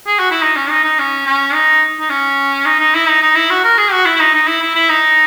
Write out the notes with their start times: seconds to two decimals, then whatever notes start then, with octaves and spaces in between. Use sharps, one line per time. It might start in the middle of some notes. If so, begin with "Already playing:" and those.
0.07 G#4
0.19 F#4
0.31 E4
0.42 D#4
0.56 C#4
0.70 D#4
0.84 D#4
0.99 C#4
1.26 C#4
1.54 D#4
2.00 D#4
2.10 C#4
2.66 D#4
2.79 D#4
2.94 E4
3.08 D#4
3.22 D#4
3.36 E4
3.50 F#4
3.64 A#4
3.78 G#4
3.92 F#4
4.05 E4
4.16 E4
4.20 D#4
4.34 D#4
4.47 E4
4.62 E4
4.75 E4
4.89 D#4